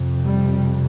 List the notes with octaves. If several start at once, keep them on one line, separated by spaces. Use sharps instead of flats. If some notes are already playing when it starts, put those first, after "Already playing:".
Already playing: F2 C3
G3